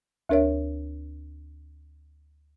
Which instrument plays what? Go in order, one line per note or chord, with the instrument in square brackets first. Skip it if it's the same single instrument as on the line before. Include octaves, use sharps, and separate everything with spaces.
[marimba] D2 D4 A#4 C#5 E5